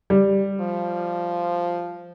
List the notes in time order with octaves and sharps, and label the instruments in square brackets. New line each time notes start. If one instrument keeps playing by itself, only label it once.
[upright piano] G3
[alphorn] F3